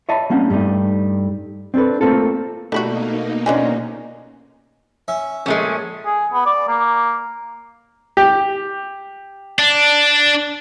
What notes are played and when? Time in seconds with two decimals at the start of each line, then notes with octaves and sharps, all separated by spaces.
0.09 C#5 D#5 E5 A5 B5
0.30 G3 A#3 C4 C#4 F#5
0.50 G2 G3 A3 D#4
1.74 C4 D4 G4 A4 B4
2.01 A3 A#3 C4 F4 A4
2.72 B2 G3 A3 A#3 D#4 E4 F#4
3.46 D3 F3 C#4 D5 D#5 G#5
5.08 C#4 E5
5.46 A#1 G#3 A3 C#4
6.06 G#4
6.33 B3
6.46 D5
6.68 A#3
8.17 G4
9.59 D4